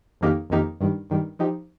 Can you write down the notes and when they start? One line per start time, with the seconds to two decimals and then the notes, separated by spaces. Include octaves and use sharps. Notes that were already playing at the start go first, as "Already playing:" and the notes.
0.21 F2 D#3 A#3 D#4 G4
0.50 F2 D#3 A#3 D#4 G4
0.81 G2 D#3 G3
1.10 G2 D#3 G3
1.39 F3 D#4 G4